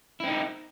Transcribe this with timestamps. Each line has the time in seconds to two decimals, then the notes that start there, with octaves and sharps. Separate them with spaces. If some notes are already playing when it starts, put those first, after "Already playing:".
0.20 E4
0.24 C4
0.27 D#4